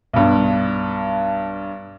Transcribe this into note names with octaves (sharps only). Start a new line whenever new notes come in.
B1 G2